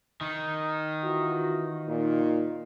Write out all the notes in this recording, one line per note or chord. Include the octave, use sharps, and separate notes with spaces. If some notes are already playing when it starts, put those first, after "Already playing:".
D#3
E3 F4 F#4
A#2 D#4